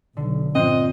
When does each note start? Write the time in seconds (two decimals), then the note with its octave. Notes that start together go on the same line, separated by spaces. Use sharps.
0.17 B1 D3
0.55 A#1 G2 F3 C4 D#5 F#6 C7